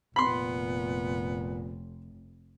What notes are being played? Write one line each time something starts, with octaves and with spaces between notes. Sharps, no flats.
F1 A#2 B3 B5 C6